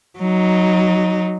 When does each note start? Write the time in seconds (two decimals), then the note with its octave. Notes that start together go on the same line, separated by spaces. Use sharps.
0.19 F#3 D#4